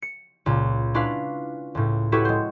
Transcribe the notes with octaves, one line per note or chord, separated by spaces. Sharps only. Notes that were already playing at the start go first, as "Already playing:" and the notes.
C#7
C#2 A#2
C#4 D4 E4 F4 B4 F5
C#2 A2
E4 F#4 G4 A4 B4 C#5
G#3 C5